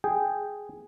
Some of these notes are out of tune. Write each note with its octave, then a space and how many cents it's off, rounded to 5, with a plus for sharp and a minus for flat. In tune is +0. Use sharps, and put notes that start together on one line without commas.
G#4 +0 G5 +0